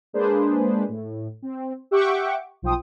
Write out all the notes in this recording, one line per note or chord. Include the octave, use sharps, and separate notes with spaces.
G#3 A#3 D4 G#4 B4 C5
A2
C4
G4 E5 F#5 G5 C#6 D6
B1 F3 C5 G5 D#6